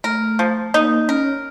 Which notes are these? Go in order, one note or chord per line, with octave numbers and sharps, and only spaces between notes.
A3 A#4
F3
A#3 D#4
C#4 A#4